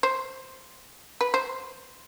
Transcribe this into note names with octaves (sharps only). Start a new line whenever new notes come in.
C5
B4
C5